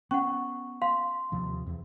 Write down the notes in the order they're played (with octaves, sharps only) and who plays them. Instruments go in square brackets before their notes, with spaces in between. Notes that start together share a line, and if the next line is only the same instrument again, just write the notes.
[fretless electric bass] B3 [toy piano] C#4 [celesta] F#5 C#6
[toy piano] F5 [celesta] C6
[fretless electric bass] D#2 C3 F3
E2